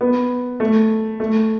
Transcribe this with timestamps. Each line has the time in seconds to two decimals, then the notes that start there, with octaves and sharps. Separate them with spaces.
0.01 B3
0.60 A3
1.20 A3